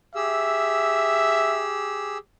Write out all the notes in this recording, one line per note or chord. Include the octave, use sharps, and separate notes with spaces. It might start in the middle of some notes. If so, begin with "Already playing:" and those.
G4 G#4 E5 E6